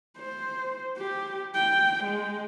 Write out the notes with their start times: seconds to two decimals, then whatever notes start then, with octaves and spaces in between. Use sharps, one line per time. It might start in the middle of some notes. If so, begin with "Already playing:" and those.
0.18 C5
0.97 G4
1.54 G5
2.04 G#3